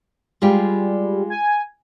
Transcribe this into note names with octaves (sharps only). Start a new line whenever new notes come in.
G3 G#3 F4 G4
G#5